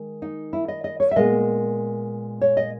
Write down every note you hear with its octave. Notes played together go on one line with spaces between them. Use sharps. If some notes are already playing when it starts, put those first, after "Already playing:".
Already playing: D#3 G#3
D#4
E4
D#5
D#5
C#5
E5
A#2 G#3 B3 D#5
C#5
D#5